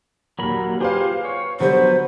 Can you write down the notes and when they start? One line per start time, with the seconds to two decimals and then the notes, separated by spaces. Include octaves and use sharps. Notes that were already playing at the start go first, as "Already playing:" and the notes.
0.39 D#2 A#2 F#3 A#4 B5
0.81 F4 G4 G#4 B4 C5 F5
1.25 C#5
1.60 D3 F#3 G3 B3 C5